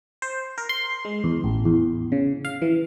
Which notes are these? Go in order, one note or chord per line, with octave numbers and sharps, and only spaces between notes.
C5
A#4
C6
G#3
E2
A1
E2
C#3
F5
E3